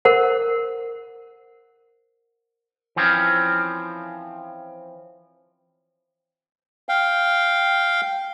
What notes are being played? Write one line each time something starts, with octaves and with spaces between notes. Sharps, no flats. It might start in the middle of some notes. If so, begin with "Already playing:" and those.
A#4 C5 F#5
E3 F3 C4 C#4
F5 G5